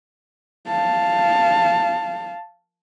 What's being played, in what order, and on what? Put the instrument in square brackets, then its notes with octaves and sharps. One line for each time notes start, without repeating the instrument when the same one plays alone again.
[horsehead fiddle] F5 A5